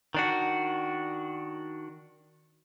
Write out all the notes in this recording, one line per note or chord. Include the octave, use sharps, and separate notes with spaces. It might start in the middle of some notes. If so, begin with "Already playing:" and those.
D#3 D4 F#4